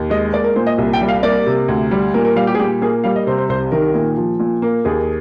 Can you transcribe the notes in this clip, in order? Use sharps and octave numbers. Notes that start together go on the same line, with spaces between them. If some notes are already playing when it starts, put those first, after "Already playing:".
Already playing: D#2
G#3 D#5
A#3 D5
A#4
A#2 C5
D#5
C2
G5
G3
F5
A#3 D5
C3
D2
G3
A#2 A#4
A#4
G3 F5
G4
G#4
A#2 G4
A#3 G#4
G3 F5
D#5
C3 C5
C5
C2 C5
D#3 A#4
A#2
F3
A#2
A#3
D#2 G#4